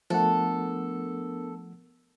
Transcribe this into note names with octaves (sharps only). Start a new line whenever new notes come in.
F3 A3 B3 D4 A4 A#4 F#5